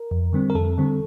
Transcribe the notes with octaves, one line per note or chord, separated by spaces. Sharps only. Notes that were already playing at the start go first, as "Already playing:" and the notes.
Already playing: A#4
F2
D3 G3 C4
A#4
F2 A4
D3 G3 C4